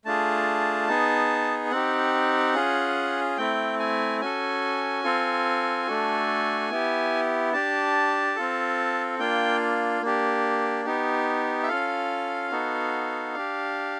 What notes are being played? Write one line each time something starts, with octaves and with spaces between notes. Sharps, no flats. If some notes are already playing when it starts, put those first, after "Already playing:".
A3 D4 F4 G#4 A5
B3 D#4 G#4
C4 D#4 G4 F#5
C#4 F4 G#4
A3 C4 E4 G5
G#5
C#4 F#4 A4 G#5
C4 F4 A4
A3 D4 F#4 A4
B3 E4 G4
D4 G4 A5
C4 F4 A4
A#3 D4 F4 G5
A#3 D4 G4
B3 D#4 G4
E5
C#4 F4 A4 F5
B3 D#4 F#4 A4
D4 G4